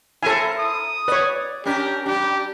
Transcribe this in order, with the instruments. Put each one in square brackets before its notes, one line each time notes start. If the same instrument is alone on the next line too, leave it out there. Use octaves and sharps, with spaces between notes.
[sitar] E4 A#4 C5 [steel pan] A4 G#5
[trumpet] D#6
[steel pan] B4 C#5 [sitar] D5
[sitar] C#4 D4 A#4 [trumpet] G4
[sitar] G3 D4 [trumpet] G4